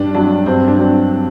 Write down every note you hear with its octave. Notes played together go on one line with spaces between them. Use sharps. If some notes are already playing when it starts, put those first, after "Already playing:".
Already playing: G2 D4
F#3 D4
G2 C4
D4
F#3 C4